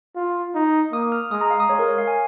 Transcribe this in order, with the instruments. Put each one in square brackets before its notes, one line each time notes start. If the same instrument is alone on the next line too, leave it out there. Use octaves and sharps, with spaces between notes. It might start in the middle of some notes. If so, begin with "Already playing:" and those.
[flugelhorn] F4
D#4
[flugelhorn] A#3 [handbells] D#6
[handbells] F6
[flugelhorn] G#3 [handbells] D#6
[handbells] A#5
F5
D#6
[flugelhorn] G#3 [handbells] C#5
[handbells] A#4
C#5
F5
G#5